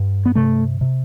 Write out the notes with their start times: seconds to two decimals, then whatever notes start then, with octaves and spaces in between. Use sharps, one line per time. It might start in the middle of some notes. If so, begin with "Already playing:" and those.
Already playing: G2
0.25 B3
0.35 C3 A3
0.81 C3